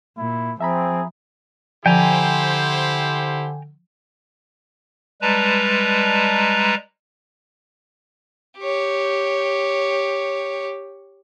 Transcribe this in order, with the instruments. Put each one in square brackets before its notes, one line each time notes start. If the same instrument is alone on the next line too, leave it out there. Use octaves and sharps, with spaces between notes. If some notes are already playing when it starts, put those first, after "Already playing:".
[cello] A#2 [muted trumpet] E4
[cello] F3 [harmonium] C4 [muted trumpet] G#4 [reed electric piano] E5 A#5 B5
[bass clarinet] D3 [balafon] F3 [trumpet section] E4 G4 C5 [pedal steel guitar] G5 G#5 A#5
[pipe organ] G3 G#3 B4 A5 A#5
[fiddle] G4 C#5